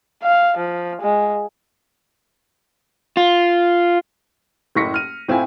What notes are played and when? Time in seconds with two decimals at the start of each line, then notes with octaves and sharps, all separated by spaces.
0.23 F5
0.58 F3
1.02 G#3
3.17 F4
4.75 F#1 A2 C#6 A#6 B6 C#7
4.94 F6 D#7
5.28 A2 C4 E4 F4 G#5